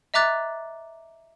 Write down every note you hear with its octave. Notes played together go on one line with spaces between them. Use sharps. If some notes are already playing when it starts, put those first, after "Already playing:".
D#5 E5 A#5 D6 F#6 A6